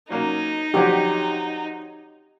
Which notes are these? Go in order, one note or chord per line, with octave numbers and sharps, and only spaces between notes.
F#3 A#3 C#4 D#4
D3 F3 F#3 G4